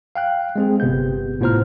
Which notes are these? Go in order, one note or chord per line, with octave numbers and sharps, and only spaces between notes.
F5 G5 F#6
G#3 C4 G#4
G1 C3 B3 G6
A2 B3 F4 C5 A#5 F6